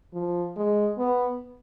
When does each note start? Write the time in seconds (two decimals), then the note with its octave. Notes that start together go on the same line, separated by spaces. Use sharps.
0.14 F3
0.56 G#3
0.98 B3